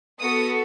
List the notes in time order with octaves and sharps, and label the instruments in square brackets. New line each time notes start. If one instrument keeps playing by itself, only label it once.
[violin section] B3 F#4 A4 D#6